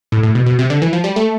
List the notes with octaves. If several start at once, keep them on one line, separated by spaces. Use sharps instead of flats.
A2
A2
B2
B2
C3
D3
E3
F3
G3
A3